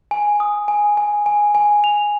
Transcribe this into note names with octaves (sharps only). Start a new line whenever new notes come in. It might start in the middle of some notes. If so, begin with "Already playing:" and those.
G#5
D#6
G#5
G#5
G#5
G#5
F7